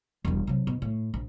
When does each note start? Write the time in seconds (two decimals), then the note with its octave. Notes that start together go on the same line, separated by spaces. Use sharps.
0.25 E1 G3
0.47 C3 F#3
0.67 B2
0.82 A2
1.14 A#1